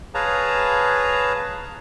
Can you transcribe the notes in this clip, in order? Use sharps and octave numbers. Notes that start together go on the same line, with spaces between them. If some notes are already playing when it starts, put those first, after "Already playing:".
G#4 B4 C#5 F5 A5 A#5